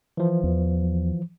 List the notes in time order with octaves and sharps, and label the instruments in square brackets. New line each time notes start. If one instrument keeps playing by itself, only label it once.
[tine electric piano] E3 F3
[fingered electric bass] E2